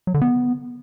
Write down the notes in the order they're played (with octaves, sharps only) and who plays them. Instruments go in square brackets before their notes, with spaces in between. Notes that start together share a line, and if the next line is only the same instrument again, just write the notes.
[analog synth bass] F#3
D3
B3